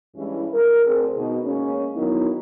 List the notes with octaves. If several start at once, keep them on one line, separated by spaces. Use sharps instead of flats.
G2 E3 G#3 C#4 E4
A#4
D2 C4 D4 G#4
B2 D#4
G#3 A#3 C#4
D#3 F#3 B3 D#4 E4